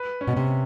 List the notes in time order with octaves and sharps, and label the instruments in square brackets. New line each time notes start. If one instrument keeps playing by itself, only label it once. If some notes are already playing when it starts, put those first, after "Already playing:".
Already playing: [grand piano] B4
C#4
[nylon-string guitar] B2
C3